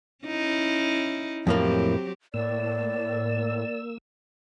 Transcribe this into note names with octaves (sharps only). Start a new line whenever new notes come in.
C#4 D#4 E4
F2 A2 F#3 A#3 C4 G4
A2 A#3 D5 E6